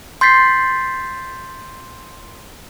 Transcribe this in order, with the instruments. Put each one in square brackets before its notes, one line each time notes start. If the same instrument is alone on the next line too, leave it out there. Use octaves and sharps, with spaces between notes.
[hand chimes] C6 G6 A6 B6 C7